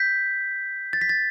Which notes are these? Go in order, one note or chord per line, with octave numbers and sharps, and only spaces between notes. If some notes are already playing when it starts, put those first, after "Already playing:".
Already playing: G6 B6
A6
B6
A6